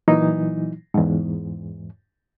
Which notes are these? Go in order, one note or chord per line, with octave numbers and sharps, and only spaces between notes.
A#2 E3 F#3 D#4 E4
E2 G#2